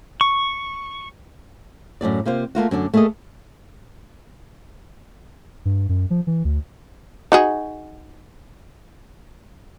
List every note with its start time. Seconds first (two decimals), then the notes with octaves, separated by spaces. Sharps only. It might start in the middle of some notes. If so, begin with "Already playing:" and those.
0.21 C#6
2.01 F#2 A2 C3 D5
2.25 C3 A#3 F4 C5
2.55 A3 A#3 F4 F#4
2.71 F#2 D3 D4 D5
2.94 A3 A#3 G#4 A4 D#5
5.65 G2
5.89 F#2
6.10 F3
6.27 E3
6.45 D2
7.32 D#4 F#4 G#4